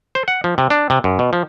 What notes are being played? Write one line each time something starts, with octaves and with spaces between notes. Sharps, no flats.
C5
F#5
F3
C3
D4
C3
F#2
B2
F3